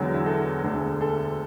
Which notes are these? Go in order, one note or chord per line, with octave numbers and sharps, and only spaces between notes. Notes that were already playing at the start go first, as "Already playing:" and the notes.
Already playing: E1 E2 D3 F#3
E4
A4
E1 D2 D3
A4